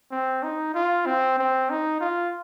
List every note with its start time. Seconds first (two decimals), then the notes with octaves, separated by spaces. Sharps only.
0.11 C4
0.43 D#4
0.74 F4
1.06 C4
1.39 C4
1.70 D#4
2.01 F4